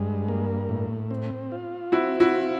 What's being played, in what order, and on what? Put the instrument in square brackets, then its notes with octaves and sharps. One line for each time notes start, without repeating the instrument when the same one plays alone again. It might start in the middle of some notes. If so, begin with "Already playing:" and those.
Already playing: [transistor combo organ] G2 G#3
A#3
A2
C4
F4
[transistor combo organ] C4 [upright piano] E4 F#4
[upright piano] E4 F#4
[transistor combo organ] F4